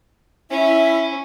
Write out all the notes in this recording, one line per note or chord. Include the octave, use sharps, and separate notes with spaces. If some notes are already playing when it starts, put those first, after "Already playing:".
C#4 E4 E5